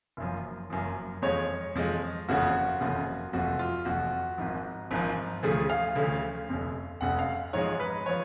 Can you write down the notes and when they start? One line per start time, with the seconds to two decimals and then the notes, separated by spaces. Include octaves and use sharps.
0.17 F#1 F#2 F3
0.70 F#1 F#2 F3
1.22 F2 F3 G#3 C#5
1.75 F2 F3 G#3
2.29 F#1 F2 C#3 F3 F#4
2.81 F#1 F2 C#3 F3
3.33 F1 F2 F3 F#4
3.59 F4
3.85 F1 F2 F3 F#4
4.38 G#1 G#2 F3
4.91 G#1 G#2 F3
5.43 D2 C#3 F3 A3 G#4
5.70 F5
5.95 D2 C#3 F3 A3
6.49 F1 F2 C#3
7.01 F1 F2 C#3 F#5
7.19 F5
7.53 G#2 F3 G#3 C#5
7.80 B4
8.06 F3 C#5